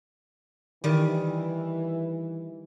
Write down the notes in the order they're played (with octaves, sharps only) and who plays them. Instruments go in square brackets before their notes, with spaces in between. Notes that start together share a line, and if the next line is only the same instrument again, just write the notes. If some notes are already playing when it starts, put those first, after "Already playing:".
[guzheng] D#3 G3 [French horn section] E3